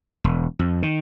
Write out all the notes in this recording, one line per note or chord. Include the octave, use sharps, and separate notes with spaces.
E1
F2
D#3